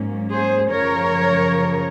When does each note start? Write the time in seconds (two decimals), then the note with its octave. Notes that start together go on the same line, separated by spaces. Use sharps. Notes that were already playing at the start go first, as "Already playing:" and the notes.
Already playing: G#2 F#3 A#3 C#4
0.31 G#4 C5
0.70 F#2 C#3 F3 A#4 C#5